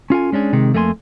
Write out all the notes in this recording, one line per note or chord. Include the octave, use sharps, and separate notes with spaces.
C#4 F4 A4 G#5
G#3 C#4 D4 G#4
C3 D#3 G#3
F2 A3 A#3 D#4 G#5 C6